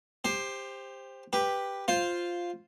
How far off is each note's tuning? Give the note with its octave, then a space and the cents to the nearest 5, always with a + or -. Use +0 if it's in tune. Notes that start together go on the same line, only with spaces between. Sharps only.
G4 +20 C5 +0
G4 +5 B4 +0
F4 +0 C5 +0